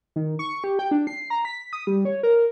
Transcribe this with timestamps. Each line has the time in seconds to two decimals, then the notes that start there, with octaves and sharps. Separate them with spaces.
0.16 D#3
0.39 C#6
0.64 G4
0.79 G5
0.91 D4
1.07 C7
1.30 A#5
1.45 B6
1.73 D#6
1.87 G3
2.05 C#5
2.23 A#4